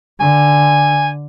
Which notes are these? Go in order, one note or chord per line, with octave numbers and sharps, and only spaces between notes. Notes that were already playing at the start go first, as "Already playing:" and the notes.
D3 G#5